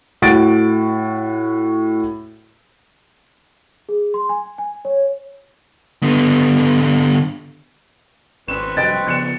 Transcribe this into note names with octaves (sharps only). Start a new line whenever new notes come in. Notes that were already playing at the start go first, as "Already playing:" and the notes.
A2 F#4 A6 D7
G#4
C6
G#5
G#5
C#5
D3 B3
G#1 C4 C#4 B4 C#6 E7
F1 G2 D#5 G5 F#6 A6
C#3 F3 B3 F#6 C#7 E7